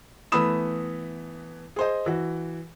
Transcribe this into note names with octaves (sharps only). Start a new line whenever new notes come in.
E3 A3 B3 B5 D#6 E7
G#4 C5 D#5
E3 F#4